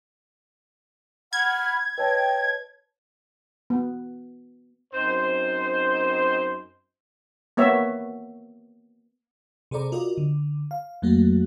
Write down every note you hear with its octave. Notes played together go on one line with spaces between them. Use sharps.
F#5 B5 F6 G#6
B4 C#5 D#5 G5 A5
B3
F#2 C4 D#4 C5
A#3 B3 C#5 E5
C3 G#4 A4 C5 D5 A#5
F4 F#4 A#4 D5 D#5
D3
F5
F2 F#3 A3 A#3 F#4